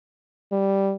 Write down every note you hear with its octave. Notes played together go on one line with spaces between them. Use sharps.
G3